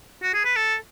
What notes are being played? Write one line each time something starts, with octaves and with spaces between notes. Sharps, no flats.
F#4
G#4
B4
A4